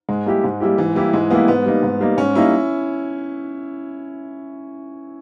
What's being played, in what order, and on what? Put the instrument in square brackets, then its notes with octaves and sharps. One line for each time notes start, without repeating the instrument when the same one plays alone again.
[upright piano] G#2 [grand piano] G#3
[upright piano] G3 A#3 E4 G4
G#2
G3 A#3 E4 G4
[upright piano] G#2 [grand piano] E3
[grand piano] E3 [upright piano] G3 A#3 E4 G4
[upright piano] G#2 [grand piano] G#3
[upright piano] G3 A#3 E4 G4 [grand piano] B3
[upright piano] G#2 [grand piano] B3
[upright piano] G3 A#3 D#4
G#2
G3 A#3 D#4
[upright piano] G#2 [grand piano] C#4
[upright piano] G3 A#3 D#4 [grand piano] E4